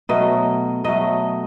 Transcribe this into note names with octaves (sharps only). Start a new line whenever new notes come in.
B2 F#3 A3 D#5
B2 F#3 A3 D#5